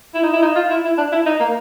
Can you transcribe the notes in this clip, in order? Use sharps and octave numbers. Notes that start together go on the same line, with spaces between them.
E4
D#4
E4
D#4
F4
E4
E4
D4
E4
D#4
A#3